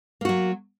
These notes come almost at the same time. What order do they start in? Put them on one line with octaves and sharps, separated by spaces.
A#3 F#4 F#3